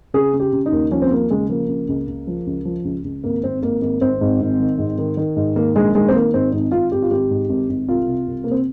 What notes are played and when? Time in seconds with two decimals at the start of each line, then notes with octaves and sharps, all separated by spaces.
0.14 C#3 G#4
0.33 C#3
0.40 G4
0.53 C#3
0.66 D#4
0.72 D#2
0.91 F3 C#4
1.02 C4
1.10 D#2 A#3
1.30 C#3 G#3
1.50 F3 A#3
1.68 C#3
1.88 C#2
2.07 C#2
2.27 F3
2.46 C#2
2.65 F3
2.85 C#2
3.04 C#2
3.24 G#1 A#3
3.43 G#1 C4
3.62 G#1 A#3
3.81 G#1 A#3
4.01 G#1 C4
4.21 G#2
4.40 G#1
4.60 D#3
4.78 G#2
4.98 D#3
5.17 D#3
5.36 G#2
5.56 D#3 A#3
5.75 A#1 G#3
5.94 D#3 G#3
6.08 C4
6.13 D#3 A#3
6.34 G#2 C4
6.52 G#1 D#4
6.71 G#1 F4
6.92 G#1 G4
7.02 F4
7.11 G#1 G4
7.30 G#2
7.49 G#1
7.69 G#1
7.88 C2 F4
8.08 C3
8.27 C2
8.44 C3 A#3
8.51 C4